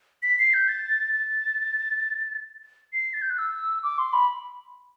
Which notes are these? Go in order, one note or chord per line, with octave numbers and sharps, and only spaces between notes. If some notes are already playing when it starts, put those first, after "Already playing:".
B6
C7
G6
A6
A6
C7
A6
G6
F#6
E6
D6
C6
B5